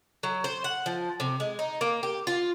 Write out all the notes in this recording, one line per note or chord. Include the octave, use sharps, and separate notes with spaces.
F#3
C5
F#5
F3
C3
G#3
D#4
A#3
G4
F4